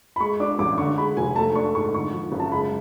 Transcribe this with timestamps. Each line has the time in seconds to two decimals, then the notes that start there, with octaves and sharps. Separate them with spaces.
0.16 B5
0.20 G#3 C#6
0.40 D4 D6
0.59 A1 D6
0.78 D3 C#6
0.97 G#3 B5
1.17 F1 G#5
1.36 A3 A5
1.55 D4 C#6
1.75 G#2 C#6
1.94 D3 C#6
2.13 F3
2.32 F#1
2.40 A5
2.51 G#3 B5